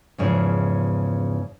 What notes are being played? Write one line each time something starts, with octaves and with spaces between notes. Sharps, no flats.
E2 G#2 C#3 F3